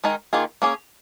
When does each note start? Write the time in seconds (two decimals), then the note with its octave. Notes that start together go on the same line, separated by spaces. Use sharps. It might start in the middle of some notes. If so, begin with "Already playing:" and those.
0.04 D#3 G#3 D#4 A#4
0.33 D#3 A#3 F4 G#4
0.62 A#3 C#4 G#4